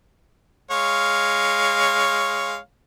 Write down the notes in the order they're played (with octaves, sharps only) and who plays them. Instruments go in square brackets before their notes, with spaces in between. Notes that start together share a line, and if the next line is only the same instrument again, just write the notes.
[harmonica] G#3 C#5 F5